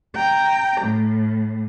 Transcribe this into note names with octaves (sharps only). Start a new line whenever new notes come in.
G5 A#5
A2